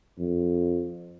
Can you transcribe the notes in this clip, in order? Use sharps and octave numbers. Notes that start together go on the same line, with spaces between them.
F2